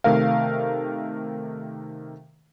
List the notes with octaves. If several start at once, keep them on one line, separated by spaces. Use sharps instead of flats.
C3 D#3 A3 A#4 F5